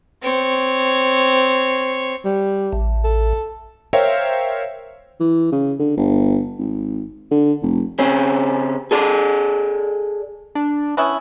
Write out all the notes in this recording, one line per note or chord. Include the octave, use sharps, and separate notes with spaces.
C4 C#5
G3
A1
A4
A#4 C5 C#5 E5 F5 G5
E3
C#3
D3
G1
G#1
D3
F1
C#3 C4 C#4
G#4 A4 D5
D4
B3 C#4 E4